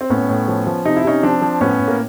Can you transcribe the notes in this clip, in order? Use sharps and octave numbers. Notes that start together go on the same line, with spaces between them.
C4
A2 B3 C#4
A2
F3
F3
C3 D#4
E4
C3 C#4 D#4
F3 C4 D4
F3
A2 B3 C#4
A2
A#3